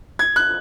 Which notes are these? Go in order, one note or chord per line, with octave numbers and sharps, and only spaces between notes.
G#6
F#6